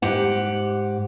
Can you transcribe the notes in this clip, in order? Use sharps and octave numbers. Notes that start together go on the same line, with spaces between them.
G#2 G4 F#5